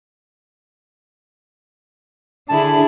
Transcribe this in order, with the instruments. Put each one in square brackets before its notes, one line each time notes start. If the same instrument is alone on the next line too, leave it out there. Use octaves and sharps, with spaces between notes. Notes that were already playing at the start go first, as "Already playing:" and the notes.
[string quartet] D3 E4 G#4 [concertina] A5